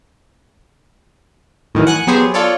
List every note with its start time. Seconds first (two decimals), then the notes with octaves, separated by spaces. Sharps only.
1.75 A2 D#3 E3 F#3
1.87 F#5 G#5 F#6
2.07 F#3 B3 G4 G#4 C5
2.34 F4 A4 C#5 D5